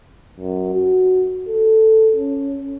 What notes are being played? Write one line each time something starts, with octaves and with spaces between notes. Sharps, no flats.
F#2
F#4
A4
C#4